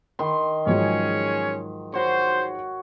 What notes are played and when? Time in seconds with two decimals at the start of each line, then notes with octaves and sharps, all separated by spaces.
0.19 D#3 C6
0.66 G#2 F3 F#3 C#4 G#4 C#5
1.93 F#4 C5 C#5